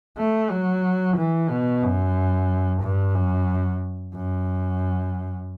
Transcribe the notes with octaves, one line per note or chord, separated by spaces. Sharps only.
A3
F#3
E3
B2
F#2
G2
F#2
F#2